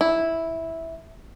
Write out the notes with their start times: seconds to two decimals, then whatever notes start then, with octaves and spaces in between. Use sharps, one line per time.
0.01 E4